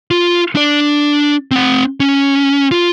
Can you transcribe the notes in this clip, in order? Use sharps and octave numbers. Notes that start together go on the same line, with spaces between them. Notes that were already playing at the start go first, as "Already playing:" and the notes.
F4
D4 D5
C4 F#5
C#4
F4